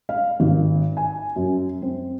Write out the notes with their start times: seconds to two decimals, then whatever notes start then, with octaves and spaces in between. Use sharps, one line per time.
0.09 F5
0.40 G#1
0.97 G#5
1.36 F#2
1.82 C4